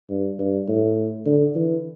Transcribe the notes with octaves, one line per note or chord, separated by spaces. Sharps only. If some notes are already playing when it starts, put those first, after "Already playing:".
G2
G2
A2
D3
E3